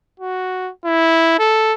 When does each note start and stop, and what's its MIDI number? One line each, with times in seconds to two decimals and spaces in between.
0.20 0.71 66
0.85 1.35 64
1.39 1.73 69